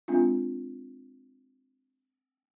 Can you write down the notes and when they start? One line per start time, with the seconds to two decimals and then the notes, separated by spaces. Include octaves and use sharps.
0.08 G#3 C4 D4 F4